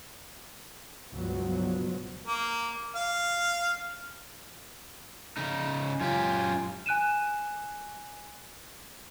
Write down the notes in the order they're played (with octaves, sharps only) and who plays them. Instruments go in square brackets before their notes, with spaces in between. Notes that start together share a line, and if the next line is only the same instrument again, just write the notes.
[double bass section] C#2 G2 B2 F3 F#3 B3
[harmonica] A#3
F5
[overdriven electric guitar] C#3 D#4
[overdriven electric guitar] F#2 G4 [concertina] F4 G#5
[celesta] G#5 F#6 D#7 E7